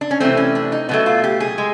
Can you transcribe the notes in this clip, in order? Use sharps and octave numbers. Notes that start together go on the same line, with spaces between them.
D4
C#4
C3 E3 A3 C4
C#4
D4
D#4
B2 F#3 A3 B3
F4
G4
G#4
G#3